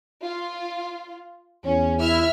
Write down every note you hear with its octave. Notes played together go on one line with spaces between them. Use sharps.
F4
E2 C#4
E4 E5 F6